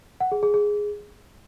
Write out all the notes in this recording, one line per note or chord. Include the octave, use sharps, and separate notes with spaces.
F#5
G#4
G#4
G#4